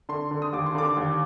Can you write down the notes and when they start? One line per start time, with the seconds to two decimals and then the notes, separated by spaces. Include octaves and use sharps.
0.09 D3 C6
0.31 D3
0.42 D#6
0.53 D#2 D6
0.66 C6
0.75 D3 D6
0.97 D#2